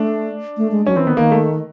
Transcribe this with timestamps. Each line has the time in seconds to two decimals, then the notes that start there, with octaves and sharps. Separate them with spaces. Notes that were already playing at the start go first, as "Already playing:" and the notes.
Already playing: A3 D4
0.57 A3
0.71 G#3
0.86 F#3 C#4
0.96 E3 C4
1.07 D#3 B3
1.17 D#3 A#3
1.32 A3